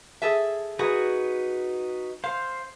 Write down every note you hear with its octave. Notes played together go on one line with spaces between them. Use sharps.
G#4 A4 E5
D#4 F#4 G#4 B4
C5 F5